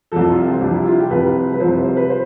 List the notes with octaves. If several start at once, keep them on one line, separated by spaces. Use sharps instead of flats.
C2 C3 F3 A4
F4
C4
C2 C3 F3 D4
E4
F4
G4
C2 C3 F3 B4
B4
C2 C3 F3 C5
C5
C5
B4
C5